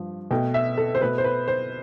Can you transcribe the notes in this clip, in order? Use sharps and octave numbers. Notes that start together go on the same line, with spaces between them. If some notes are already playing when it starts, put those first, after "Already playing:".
Already playing: G2 F3
B2 A3 G5
E5
A4
C5
B2 A3 B4
C5
B4
C5